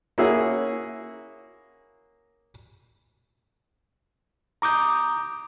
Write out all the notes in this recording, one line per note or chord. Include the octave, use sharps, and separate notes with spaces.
A#3 C#4 E4 F#4 G#4
A#5 D6 D#6 G6